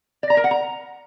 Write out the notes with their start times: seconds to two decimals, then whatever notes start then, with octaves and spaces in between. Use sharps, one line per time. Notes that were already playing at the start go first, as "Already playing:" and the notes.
0.23 D5
0.30 A#5
0.37 A#4
0.44 F#5
0.51 A#5